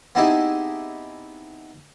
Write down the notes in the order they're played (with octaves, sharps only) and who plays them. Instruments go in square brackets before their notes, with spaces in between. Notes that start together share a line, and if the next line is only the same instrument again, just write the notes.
[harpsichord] B3 C4 D#4 E4 G4 G#4